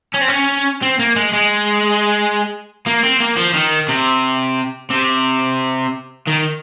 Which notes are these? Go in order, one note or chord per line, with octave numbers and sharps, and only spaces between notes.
C#4
C4
C#4
C4
A#3
G#3
G#3
A#3
C4
A#3
F3
D#3
C3
C3
D#3